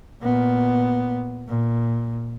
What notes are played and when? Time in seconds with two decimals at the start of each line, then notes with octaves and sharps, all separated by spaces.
0.22 A#2 B3
1.48 A#2